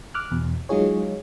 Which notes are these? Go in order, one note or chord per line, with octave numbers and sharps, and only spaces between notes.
D6 F6 F#6
E2 B2
F#3 G#3 D#4 F4 G#4 C#5